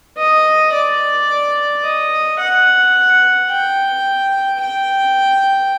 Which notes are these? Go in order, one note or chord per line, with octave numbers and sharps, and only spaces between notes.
D#5
D5
D#5
F#5
G5
G5